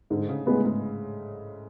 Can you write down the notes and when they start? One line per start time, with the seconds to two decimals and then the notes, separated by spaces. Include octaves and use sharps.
0.10 G#2 D3
0.29 C#3
0.46 A2 G#3 B3
0.64 G#2